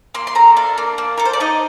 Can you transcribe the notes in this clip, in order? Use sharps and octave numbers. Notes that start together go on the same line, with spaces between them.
A#3 C6
C6
A4 A#5
D4 F5
A#3
A#3
A4 A#4
C5
D5
D#4 D#5